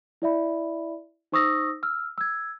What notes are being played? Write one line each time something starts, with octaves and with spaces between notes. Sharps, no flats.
E4 D5 E5 B5
D#4 C5 C#6 D#6 E6 A#6
E6 F6
E6 G#6